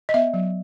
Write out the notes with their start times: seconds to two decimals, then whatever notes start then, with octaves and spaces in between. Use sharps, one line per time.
0.09 D#5
0.14 B3 E5
0.34 F#3